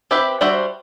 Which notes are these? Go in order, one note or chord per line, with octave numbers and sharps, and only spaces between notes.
C4 G4 B4 E5
G3 D4 F#4 C5 E5